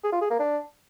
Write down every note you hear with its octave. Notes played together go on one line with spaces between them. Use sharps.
G#4
F4
G#4
A#3
D4